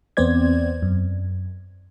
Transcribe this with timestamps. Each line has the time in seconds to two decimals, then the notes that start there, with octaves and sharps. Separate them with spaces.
0.17 E2 B3 C4 C5 D5 G#6
0.82 F#2